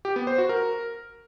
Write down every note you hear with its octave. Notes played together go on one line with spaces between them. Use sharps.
G4
B3
C5
F#4
A#4